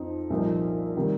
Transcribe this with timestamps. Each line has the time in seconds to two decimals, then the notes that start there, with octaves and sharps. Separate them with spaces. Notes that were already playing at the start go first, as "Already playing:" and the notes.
Already playing: F2 F3 C4 D#4
0.30 C2 A#2 F3 A#3 D#4
0.96 C3 D#3 G3 A#3